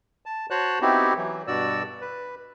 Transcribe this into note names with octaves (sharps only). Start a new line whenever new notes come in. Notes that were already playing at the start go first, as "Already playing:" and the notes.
A5
F#4 C5 C#5 A5 F#6
B3 C4 D#4 E4 F#4 G4
E3 F#3
G2 B2 F#4 D5 E6
B4